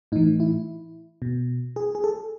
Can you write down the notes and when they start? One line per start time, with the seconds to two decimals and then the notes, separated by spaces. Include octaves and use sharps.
0.12 A2 D#4
0.16 E3
0.40 E4
1.22 B2
1.76 G#4
1.95 G#4
2.04 A4